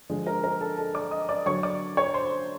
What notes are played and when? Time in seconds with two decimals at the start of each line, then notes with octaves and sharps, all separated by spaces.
0.10 D3 F3 G#3
0.26 A#4 A#5
0.43 A#4 A#5
0.61 A4 A5
0.77 A4 A5
0.94 D5 D6
1.11 D#5 D#6
1.29 D5 D6
1.46 D3 F#3 C#5 C#6
1.63 D5 D6
1.97 C#5 C#6
2.14 C5 C6